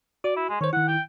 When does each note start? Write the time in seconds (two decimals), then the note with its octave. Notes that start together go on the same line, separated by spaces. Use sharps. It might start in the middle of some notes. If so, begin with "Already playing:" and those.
0.24 F#4 D5
0.36 E4
0.49 G#3
0.61 D#3 C5 C#5
0.73 D#3 E4 F#5
0.88 G5